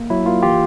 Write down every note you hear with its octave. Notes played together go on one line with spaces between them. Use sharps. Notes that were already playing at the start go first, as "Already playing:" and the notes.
Already playing: A#3
F#3 E4
A#3 F4
E3 F4 G4